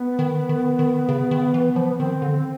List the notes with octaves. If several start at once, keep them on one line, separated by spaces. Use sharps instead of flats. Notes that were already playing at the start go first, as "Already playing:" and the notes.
Already playing: B3
D#3
D#3
D#3
C#3
D#3
E3
F3
D#3 C4
D3